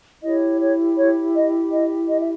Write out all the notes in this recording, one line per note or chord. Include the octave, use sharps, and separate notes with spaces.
E4 G4 C#5 D#5
C#5
C#5
D#5
D#5
D#5
E5